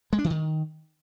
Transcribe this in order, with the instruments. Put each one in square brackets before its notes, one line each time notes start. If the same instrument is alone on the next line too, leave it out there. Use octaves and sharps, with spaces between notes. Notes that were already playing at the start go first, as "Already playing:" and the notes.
[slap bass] G#3
D4
E3
D#3